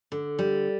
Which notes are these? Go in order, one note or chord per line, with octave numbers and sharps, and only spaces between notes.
D3
G3